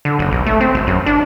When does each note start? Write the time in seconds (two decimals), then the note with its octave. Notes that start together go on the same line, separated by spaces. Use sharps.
0.05 D3
0.19 F#1
0.31 B1
0.46 A3
0.61 C4
0.75 G#1
0.87 F#2
1.06 D4